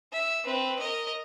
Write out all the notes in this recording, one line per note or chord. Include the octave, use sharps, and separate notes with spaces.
E5
C4 B4
A#4 D#5